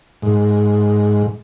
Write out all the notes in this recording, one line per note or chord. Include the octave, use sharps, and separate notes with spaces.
G#2